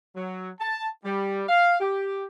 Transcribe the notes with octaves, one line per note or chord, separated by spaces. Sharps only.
F#3
A5
G3
F5
G4